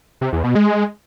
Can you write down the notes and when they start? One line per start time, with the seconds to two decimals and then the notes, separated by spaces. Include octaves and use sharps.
0.21 C3
0.33 E2
0.44 B2
0.55 G#3